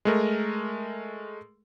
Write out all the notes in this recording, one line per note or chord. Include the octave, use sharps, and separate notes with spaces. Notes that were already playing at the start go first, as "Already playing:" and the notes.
G#3 A3 A#4